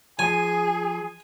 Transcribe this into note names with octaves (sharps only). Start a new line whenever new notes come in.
F3 G#4 G#5